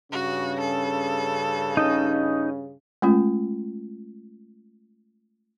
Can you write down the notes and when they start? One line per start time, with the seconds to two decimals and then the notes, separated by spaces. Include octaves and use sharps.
0.12 G2 C#3 C#4 F#4
0.60 A4
1.77 C#4 D#4 D#5
3.02 G#3 A3 C#4 F4